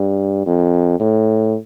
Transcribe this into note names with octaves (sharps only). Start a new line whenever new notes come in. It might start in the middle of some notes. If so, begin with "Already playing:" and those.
Already playing: G2
F2
A2